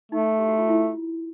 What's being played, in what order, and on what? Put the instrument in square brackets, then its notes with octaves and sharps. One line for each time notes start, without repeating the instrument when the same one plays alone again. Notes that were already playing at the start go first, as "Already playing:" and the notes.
[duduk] A3 [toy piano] D#4
[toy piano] G4
F#4
F4
E4